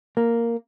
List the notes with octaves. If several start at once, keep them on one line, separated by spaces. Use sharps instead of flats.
A#3